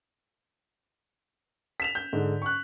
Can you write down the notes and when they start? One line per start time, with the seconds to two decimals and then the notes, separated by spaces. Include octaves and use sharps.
1.80 B6 E7 F7
1.95 G6
2.13 G#2 D3
2.42 C#6 F#6